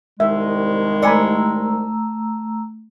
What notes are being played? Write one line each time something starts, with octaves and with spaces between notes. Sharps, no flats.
C2 D#3 G#3 E5
A3 D5 G#5 A#5 B5 E6